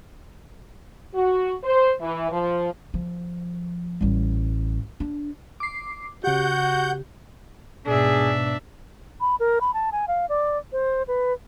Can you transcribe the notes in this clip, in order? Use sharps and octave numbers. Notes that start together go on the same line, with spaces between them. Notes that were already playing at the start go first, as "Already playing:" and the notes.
F#4
C5
E3
F3
F3
A1 G3
D4
D6 C7
C#3 F#4 G4 F#5 G6
G#2 B2 D4 G#4 E5
B5
A#4
B5
A5
G#5
F5
D5
C5
B4